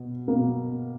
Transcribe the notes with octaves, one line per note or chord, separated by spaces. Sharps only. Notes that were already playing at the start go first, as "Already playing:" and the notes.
Already playing: B2
B2 A#3